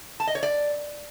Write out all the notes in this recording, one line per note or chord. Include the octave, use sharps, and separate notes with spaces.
A5
D#5
C#5
D5